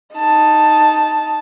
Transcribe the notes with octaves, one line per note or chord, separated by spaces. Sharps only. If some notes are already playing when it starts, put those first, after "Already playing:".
D#4 A5